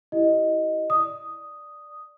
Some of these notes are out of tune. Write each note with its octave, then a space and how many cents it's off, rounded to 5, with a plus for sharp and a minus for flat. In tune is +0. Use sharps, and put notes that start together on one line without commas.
E4 +0 G4 -20 D#5 +0
D5 +0 D#6 +0